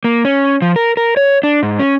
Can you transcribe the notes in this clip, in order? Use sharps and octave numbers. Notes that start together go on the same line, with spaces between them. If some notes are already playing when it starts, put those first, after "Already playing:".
A#3
C#4
F3
A#4
A#4
C#5
D4
G#2
C#4